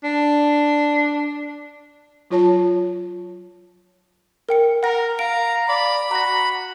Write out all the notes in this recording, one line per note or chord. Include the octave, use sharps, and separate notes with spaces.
D4
F#3 F4 C#5 A5
A#4 G5 C#7
A#4 F#5 A#6
F5 A#5 D7
D5 B5
F#4 A#5 A#6